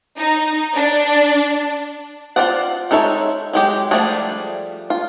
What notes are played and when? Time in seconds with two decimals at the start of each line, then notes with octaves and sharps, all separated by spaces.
0.18 D#4
0.76 D4
2.36 F4 G#4 C5 D5 F#5
2.91 G#3 D#4 A4 C#5 E5
3.53 F#3 G#3 G4
3.91 F3 G3 A3 D4 G#4
4.90 F4